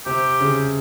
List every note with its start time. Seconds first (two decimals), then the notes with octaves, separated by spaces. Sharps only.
0.06 C3 G4
0.40 C#3